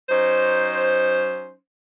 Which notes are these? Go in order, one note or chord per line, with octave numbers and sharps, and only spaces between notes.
F#3 C#4 D#4 C5